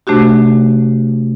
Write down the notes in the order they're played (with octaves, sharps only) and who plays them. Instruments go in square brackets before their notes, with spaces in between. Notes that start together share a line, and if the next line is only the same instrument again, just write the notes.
[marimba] C3 A3 D4 F#4 G4